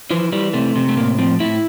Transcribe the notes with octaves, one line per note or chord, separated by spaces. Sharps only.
E3 F3
E3 G3
C3 A3
C3
A3
A2 A#3
F3 C4
A2 E4